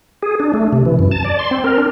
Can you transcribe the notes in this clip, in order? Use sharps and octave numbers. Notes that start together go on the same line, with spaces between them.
G#4
D4
A3
C3
E3
F#2
A5
D5
C6
C4
A#4
D4